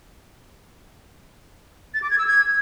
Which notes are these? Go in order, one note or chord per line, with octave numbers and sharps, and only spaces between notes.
A6
D6
G#6
E6
G#6